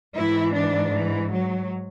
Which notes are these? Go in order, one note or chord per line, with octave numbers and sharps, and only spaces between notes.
G#2 E3 E4
D4
E3
F#3